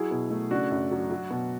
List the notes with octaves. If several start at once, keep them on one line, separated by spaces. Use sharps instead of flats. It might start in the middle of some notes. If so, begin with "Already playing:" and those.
Already playing: F#3 E4 G#4
B2
A3
C#3 D4 F#4
F#2
F#3
F#3
B2